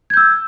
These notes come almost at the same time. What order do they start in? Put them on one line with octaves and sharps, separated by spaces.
G#6 G6 E6